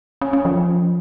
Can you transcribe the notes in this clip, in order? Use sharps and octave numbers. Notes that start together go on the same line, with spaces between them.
C#4
C#4
F3